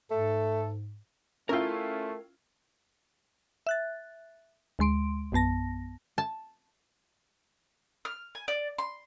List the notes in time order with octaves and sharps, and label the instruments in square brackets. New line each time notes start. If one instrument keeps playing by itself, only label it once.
[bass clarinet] G#2 [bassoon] A3 [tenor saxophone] A4
[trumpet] A3 [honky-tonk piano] C#4 E4 F4 [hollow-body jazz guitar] A#4 G5
[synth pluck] E5 F#6 A6
D2 G#3 C6 D7
A#1 F#2 B3 A5 A#6
[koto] A5
[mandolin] F6
G#5
D5
C6